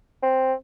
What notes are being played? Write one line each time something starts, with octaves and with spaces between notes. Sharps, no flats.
C4